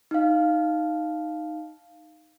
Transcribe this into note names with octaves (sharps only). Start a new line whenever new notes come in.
D#4 F5